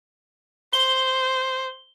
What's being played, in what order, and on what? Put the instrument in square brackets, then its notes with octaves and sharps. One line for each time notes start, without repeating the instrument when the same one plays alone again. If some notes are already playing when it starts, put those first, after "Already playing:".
[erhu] C5 [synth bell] G7